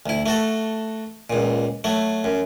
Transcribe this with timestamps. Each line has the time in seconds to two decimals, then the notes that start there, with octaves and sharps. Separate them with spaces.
0.06 D2 E4
0.26 A3 F#4 A4
1.30 C#2 A#2
1.84 F#3 A3
2.24 F#2